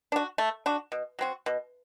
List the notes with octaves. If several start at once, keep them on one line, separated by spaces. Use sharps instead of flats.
D4 F#4
A3
D4 F#4
B2
F#3 C4 F#4
B2